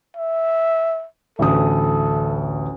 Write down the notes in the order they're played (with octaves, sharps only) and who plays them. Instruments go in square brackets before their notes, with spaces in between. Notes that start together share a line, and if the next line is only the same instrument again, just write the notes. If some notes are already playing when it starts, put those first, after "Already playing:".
[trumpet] E5
[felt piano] A1 D2 D#6 [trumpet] A4